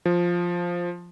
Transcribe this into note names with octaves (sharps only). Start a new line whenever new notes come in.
F3